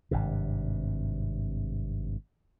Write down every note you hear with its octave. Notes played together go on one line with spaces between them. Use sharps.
G#1 G2 C3